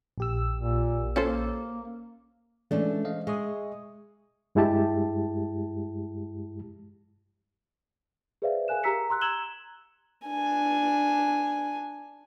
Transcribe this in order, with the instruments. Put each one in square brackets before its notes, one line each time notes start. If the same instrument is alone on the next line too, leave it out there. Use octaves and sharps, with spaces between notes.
[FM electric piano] A#1 G4 E6
[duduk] A#2
[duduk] A#3 [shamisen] C#4 A4 C5
[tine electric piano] E3 G#3 C#4 [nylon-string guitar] A3 D4
[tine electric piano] C5 D#5 F5
[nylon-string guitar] G#3 [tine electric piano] E5 C#6 D#6
[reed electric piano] G2 G#3 E4 G4 A5
[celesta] G#4 B4 C5 D5 E5 F5
A#4 F5 G#5 F#6 E7
G4 A#5 E6 B6 C#7
A#5 C6 E6 F#6
A#5 E6 G#6 E7 F#7 G7
[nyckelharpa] D4 G#5